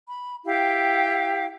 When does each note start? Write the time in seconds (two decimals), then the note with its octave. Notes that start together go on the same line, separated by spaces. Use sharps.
0.08 B5
0.45 E4 G4 F5 G5